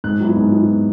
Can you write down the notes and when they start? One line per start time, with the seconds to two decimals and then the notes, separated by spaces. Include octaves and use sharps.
0.04 G#2 F#6
0.20 F#3 B3 E4
0.37 G#2
0.52 F#3 B3 E4